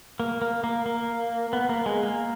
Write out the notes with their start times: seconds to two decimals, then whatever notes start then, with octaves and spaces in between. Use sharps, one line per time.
0.20 A#3
0.42 A#3
0.64 A#3
0.86 A#3
1.53 B3
1.69 A#3
1.86 G#3
2.03 A#3